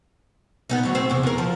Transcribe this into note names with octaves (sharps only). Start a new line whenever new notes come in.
B3 C4 D#4
D2 F#3
C4
E2 C3
E2 A#4
F3